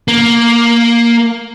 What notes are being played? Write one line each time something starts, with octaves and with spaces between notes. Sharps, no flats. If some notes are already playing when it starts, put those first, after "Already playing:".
A#3